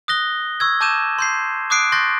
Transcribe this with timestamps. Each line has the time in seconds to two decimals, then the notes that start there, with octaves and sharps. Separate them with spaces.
0.08 D#6 F#6 A#6 G7
0.60 C#6 E6 G#6
0.81 A5 D6 G6 D#7 E7
1.18 C6 G6 C7
1.70 D6 D#6 F#6 C7 D7
1.92 C6 C#6 F#6 G6 A6 A#6